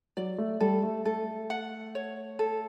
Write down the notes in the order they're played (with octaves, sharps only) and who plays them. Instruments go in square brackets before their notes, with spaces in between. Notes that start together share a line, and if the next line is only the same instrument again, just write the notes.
[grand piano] F#3 [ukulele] D5
[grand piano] A3
[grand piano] G3 [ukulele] A4
[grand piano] A3
[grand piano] A3 [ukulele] A4
[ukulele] F#5
C#5
A4